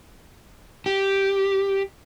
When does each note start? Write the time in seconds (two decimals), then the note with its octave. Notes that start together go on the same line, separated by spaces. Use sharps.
0.86 G4